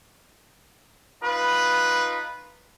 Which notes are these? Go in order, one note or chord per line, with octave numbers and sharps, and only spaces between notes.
D#4 F4 B4